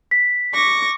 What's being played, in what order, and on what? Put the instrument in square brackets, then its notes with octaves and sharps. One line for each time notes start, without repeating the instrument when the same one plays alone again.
[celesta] B6
[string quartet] C#6 D6 A#6